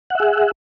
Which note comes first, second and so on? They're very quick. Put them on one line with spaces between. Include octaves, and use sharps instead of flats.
F#5 E5 G#4